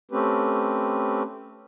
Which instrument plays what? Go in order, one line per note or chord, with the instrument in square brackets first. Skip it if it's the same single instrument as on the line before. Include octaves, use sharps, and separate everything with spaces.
[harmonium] A3 C4 C#4 G4 B4